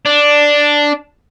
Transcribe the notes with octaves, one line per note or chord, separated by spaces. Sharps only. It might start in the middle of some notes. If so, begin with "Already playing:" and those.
D4